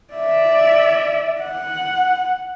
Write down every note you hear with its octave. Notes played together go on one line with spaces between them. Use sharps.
D5 E5
F#5